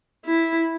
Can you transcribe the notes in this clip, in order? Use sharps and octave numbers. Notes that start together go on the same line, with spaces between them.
E4